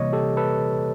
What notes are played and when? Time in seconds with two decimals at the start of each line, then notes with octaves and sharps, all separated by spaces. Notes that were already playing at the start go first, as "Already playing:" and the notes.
Already playing: C3 E3 G3 A#3 C#5 D#5
0.13 G4 A4
0.37 A4 B4